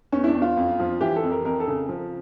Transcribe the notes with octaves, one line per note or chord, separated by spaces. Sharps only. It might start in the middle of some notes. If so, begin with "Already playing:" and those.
E2 C#4
E4
D4
E2
F4
F2
F3
E3 G4
A4
F2
A#4
F2 A#4
A4
C#3
F3